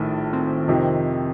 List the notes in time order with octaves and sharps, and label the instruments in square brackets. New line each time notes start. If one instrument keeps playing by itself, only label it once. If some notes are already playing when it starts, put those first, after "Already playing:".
Already playing: [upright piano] A#1 A2 [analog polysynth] D#3
[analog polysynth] C4
[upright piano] F2 C3 D#3